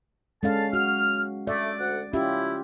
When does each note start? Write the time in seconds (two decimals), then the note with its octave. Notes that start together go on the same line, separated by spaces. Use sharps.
0.43 D3 G#3 C#4 F5 A5
0.73 F#4 F6
1.47 A3 D5
1.79 D2 F#5
2.13 C#4 E4 F4 G4